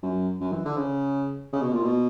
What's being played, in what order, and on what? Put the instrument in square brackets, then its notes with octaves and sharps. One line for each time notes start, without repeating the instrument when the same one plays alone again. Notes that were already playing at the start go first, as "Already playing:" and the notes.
[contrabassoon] F#2
F#2
E3
D3
C#3
C#3
B2
A#2
B2